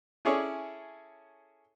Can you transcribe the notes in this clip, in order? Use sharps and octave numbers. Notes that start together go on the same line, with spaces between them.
C#4 E4 G#4 A4 C#5 D5